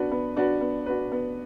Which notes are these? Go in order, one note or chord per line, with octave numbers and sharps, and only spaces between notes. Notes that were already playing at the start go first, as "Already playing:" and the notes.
Already playing: B3 D4 F#4 B4
B3
D4 F#4 B4
B3
D4 F#4 B4
B3